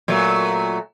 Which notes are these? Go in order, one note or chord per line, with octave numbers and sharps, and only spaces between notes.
A#2 F#3 A3